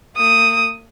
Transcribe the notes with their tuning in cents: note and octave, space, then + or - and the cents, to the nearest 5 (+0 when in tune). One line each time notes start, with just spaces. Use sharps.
A#3 -45 D#6 +0